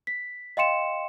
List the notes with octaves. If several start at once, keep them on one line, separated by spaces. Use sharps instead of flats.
B6
D#5 F5 G5 C6 C#7 E7